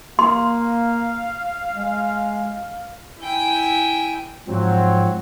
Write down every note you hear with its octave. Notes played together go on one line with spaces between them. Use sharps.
A#3 F5 C6
G#3
E4 G5 G#5
G#2 F3 F#3 C4